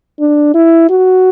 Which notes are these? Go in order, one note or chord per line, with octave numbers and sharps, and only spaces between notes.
D4
E4
F#4